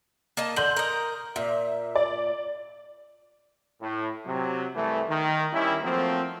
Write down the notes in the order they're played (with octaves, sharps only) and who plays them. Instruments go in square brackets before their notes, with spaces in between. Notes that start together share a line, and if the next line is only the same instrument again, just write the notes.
[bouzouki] A#3 D#5 A5
[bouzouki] D3 [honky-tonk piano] C6 G6 F#7
[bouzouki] A#4 D#5
[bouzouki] A#2 [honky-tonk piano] E5
[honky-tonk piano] D5
[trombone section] A2
C3 F#3
C2 E3 A3
D#3
D#3 G3 C#4 E4
F3 F#3 A3 A#3 C4